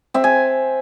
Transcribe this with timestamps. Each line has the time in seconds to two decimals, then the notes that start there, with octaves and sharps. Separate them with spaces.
0.14 C4 E5
0.24 G#5